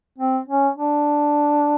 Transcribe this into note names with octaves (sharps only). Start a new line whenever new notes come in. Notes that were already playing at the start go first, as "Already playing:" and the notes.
C4
C#4
D4